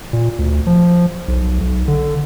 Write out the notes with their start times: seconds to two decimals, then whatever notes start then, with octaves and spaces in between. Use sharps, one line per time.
0.13 A#2
0.38 D2
0.67 F3
1.28 B1
1.61 B1
1.88 D3